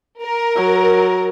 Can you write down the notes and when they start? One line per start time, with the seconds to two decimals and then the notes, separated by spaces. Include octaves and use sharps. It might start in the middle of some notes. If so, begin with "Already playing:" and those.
0.22 A#4
0.56 F#3